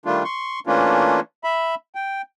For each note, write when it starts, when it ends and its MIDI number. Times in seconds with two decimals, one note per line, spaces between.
0.06 0.23 51
0.06 0.23 55
0.06 0.23 57
0.06 0.23 62
0.06 0.23 65
0.24 0.60 84
0.24 0.60 85
0.67 1.20 52
0.67 1.20 57
0.67 1.20 58
0.67 1.20 61
0.67 1.20 62
0.67 1.20 65
1.44 1.75 76
1.44 1.75 83
1.95 2.22 79